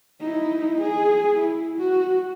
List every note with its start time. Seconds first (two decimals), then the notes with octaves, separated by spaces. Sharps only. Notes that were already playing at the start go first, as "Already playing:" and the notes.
0.20 D#4 E4
0.81 G#4
1.37 E4
1.78 F#4